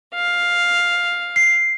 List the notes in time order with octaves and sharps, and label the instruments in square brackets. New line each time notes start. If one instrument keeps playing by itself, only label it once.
[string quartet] F5
[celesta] C7